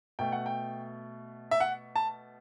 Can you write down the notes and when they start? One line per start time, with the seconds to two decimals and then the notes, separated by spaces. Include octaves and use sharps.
0.19 B2 A3 G5
0.32 F#5
0.46 G5
1.51 E5
1.60 F#5
1.96 A5